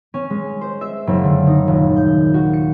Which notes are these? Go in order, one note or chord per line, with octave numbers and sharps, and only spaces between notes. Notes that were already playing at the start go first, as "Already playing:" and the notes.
C#4
G#3
C5
E5
F#1
D3
D#4
D#1
G6
F#4
C#7